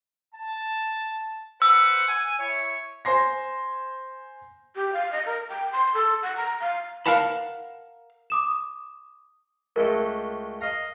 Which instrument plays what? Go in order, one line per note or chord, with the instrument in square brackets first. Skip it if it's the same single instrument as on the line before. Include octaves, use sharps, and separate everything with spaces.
[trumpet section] A5
[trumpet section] B4 C5 F#5 [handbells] E6
[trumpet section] G#5
E4 C#5
[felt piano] C5 G#5 C6 A#6
[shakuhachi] G4
F5
D#5
A#4
G5
C6
A4
F#5
A#5
F5
[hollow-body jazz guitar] A#4 F5 F#5 A5 B5
[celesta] D6 D#6 E7
[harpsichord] C#2 G#3 A3 [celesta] A#4
[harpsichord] D#5 F5 A#5